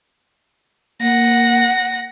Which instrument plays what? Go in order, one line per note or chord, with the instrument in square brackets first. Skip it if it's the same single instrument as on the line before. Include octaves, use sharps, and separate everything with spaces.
[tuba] A#3 [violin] F#5 A#6